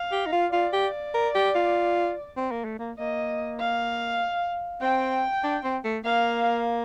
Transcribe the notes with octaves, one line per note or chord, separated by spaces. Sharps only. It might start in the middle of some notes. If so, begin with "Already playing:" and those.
Already playing: F5
G4
D#4
F4
F4 D5
G4
A#4
G4
F4
C4
A#3
A3
A#3
A#3 D#5
F5
C4 G5
D4
C4
A3
A#3 F5